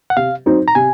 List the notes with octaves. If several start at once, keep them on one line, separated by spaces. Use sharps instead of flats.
F#5
C3 F5
F#3 C4 D#4
A#5
C3 G#5